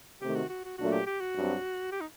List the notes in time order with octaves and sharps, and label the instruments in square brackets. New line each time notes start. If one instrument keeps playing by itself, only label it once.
[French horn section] C3 D#3 A3 [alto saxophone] G4
[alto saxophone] F#4
F#4
F#4
[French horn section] A#2 F#3 A3 D4 [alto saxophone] F#4
[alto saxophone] G4
G4
F#4
[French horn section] G2 F#3 C4
[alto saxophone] G4
D#4